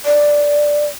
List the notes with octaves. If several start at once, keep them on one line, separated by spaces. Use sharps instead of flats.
D5